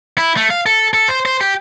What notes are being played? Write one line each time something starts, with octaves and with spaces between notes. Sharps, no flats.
E4
A3
F5
A4
A4
C5
C5
G4